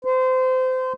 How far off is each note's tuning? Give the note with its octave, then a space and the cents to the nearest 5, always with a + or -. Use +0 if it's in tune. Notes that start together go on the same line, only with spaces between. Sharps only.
C5 -25